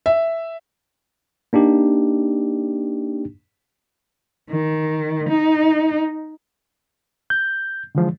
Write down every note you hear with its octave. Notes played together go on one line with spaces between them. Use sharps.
E5
A#3 D4 D#4 G4
D#3
D#4
G6
D3 E3 F3 G#3